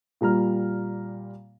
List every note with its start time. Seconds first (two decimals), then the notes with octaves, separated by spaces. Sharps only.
0.21 A#2 G3 A#5 F6